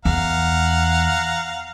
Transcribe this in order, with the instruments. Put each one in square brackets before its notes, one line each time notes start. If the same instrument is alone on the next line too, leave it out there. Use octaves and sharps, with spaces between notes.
[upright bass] E2 [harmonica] F5 F#5 A#5